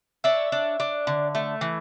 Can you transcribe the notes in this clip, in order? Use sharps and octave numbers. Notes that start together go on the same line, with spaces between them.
D4 C#5 E5
D4
D4
D3
A3
E3